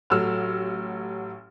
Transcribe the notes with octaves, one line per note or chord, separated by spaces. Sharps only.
A1 F#3 A4 E6 F6